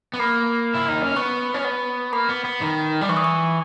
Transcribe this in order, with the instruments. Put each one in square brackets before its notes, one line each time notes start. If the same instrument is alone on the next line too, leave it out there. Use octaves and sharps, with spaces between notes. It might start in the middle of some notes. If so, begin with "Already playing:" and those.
[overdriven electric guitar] B3
[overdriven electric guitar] A#3 [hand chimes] B5
[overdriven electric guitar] E4
D#4
C#4
[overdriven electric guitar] B3 [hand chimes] C#6
[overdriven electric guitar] C#4
B3
[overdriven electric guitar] A#3 [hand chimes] B5
[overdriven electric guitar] B3
B3
D#3
G3
[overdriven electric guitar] E3 [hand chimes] C#6
[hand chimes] D#6
C#6